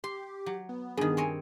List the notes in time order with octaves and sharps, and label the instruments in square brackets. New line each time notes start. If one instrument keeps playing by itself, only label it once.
[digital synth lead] G4 [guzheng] C6
[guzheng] F#3
[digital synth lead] B3
[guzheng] G2 D#3 [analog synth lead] G#4
[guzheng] C4 C#5 D#5